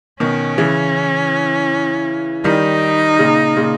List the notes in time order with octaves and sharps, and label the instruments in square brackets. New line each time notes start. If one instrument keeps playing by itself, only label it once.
[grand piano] B2 D#3 [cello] C#4
[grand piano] C#3 E3
[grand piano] D#3 G3 [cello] D#4
[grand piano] A#2 C#3
A#2 C#3